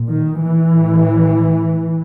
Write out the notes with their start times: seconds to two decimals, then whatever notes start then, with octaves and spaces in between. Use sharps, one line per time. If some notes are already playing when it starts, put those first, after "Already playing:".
Already playing: A#2
0.09 D#3
0.41 E3
0.72 A2